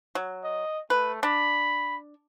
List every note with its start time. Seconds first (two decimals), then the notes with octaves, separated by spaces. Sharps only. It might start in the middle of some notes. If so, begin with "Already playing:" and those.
0.15 F#3
0.44 D#5
0.90 A3 B4
1.23 D4 B5